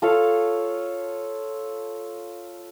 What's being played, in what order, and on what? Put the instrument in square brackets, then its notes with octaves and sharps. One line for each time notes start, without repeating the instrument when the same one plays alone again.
[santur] F4 A4 C#5 F5